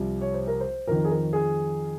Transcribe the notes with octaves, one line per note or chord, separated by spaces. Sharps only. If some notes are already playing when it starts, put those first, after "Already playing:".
Already playing: C2 C3 F3
C#5
C5
A#4
C5
F2 D#3 A#4
G#4
A#4
G#4